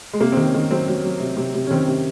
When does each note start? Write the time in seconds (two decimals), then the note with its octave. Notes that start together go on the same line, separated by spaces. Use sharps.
0.13 G#3
0.20 C3 A#3
0.32 C4
0.37 D#3
0.46 C#4
0.54 D#3
0.71 F#3 C4
0.88 F#3
1.05 F#3
1.20 C3
1.37 C3
1.54 C3
1.67 C#4
1.71 D#3 C4
1.88 C3